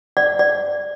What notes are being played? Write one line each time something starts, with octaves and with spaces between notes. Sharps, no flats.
D5
D5